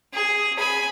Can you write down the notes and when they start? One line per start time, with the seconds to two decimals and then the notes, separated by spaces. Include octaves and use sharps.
0.14 G#4
0.59 G#5 B5